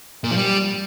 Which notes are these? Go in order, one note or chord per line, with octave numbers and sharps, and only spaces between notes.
A#2
F3
G3